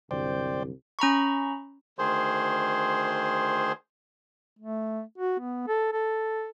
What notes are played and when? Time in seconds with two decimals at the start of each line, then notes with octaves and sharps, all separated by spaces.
0.11 D#1 C2 F#2 D3 F#3 C5 D5 G5
0.99 C#4 A#5 B5 C#6
1.99 D2 D#3 G#4 C5 C6
4.59 A3
5.18 F#4
5.40 B3
5.68 A4
5.93 A4